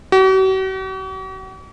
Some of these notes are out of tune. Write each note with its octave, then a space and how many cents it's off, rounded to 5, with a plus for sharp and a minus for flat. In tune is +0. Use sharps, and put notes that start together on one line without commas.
F#4 +45